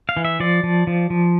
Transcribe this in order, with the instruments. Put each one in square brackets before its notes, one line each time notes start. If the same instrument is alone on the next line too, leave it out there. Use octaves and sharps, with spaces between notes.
[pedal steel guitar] F5
E3
E5
F3 D5
F3
F3
F3